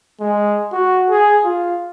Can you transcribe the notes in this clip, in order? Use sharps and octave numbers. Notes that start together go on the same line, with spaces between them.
G#3
F#4
G#4
F4